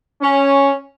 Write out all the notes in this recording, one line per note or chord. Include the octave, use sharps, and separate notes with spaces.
C#4